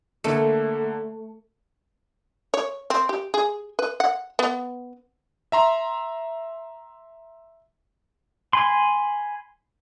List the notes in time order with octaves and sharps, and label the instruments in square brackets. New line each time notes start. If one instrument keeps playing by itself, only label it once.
[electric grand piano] D3 A#3 C#7 [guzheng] A3
[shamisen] C#5
C4
G4
G#4
B4
F#5
B3
[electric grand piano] E5 A#5 C6
[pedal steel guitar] G#5 B5 C6